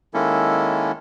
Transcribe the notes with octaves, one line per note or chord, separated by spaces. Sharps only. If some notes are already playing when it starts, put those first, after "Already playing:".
D#3 G#3 A#3 C#4 E4 A4